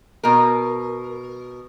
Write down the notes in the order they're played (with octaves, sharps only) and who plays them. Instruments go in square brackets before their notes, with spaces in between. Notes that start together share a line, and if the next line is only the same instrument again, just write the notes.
[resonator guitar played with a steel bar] B2 A#4